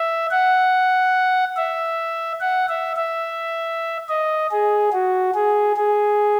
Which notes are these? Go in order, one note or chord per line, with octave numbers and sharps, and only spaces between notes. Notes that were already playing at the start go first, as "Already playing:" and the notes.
Already playing: E5
F#5
E5
F#5
E5
E5
D#5
G#4
F#4
G#4
G#4